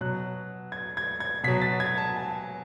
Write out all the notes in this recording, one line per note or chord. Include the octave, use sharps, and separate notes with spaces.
B2 F#3 F#6
G#6
G#6
G#6
B2 F#3 B6
A6
G#6
A5
G#5